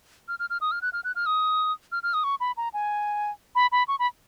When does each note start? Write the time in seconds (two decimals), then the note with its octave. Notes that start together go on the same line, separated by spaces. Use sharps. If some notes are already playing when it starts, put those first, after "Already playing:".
0.28 F6
0.39 F6
0.50 F6
0.61 D#6
0.71 F6
0.82 F#6
0.93 F6
1.04 F#6
1.15 F6
1.26 D#6
1.92 F6
2.03 F6
2.13 D#6
2.24 C#6
2.40 B5
2.57 A#5
2.74 G#5
3.55 B5
3.72 B5
3.88 C#6
3.99 B5